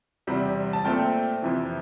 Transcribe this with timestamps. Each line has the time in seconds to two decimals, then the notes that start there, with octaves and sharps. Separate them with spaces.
0.27 E2 C3 G3
0.73 A5
0.84 A#2 A3 C4 G5
1.42 F2 C3 E3